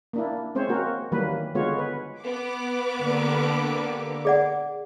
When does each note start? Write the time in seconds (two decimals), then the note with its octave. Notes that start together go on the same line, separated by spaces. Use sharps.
0.13 A#3 D4 E4
0.55 G#3 C4 C#4 C5 C#5
0.69 A#3 F#4 A#4
1.12 D#3 E3 F#3 G3 A#3 B4
1.55 D3 G#3 B3 F4 F#4 C#5
1.78 B4
2.20 B3 D6
3.01 D3 A#3 G4
4.25 G#4 D5 F#5